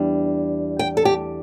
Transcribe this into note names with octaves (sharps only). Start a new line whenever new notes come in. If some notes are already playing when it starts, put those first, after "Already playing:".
Already playing: E2 G3 D4
G5
A4
G4